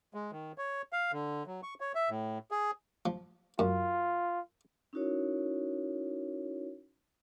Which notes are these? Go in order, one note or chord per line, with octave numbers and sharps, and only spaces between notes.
G#3
D#3
C#5
F5
D3
F#3
C#6
C#5
E5
A2
G#4
F3
F#2 F4
C#4 D#4 E4 F#4 A#4 C#5